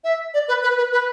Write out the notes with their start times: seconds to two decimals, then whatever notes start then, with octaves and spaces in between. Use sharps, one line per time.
0.04 E5
0.34 D5
0.48 B4
0.63 B4
0.78 B4
0.92 B4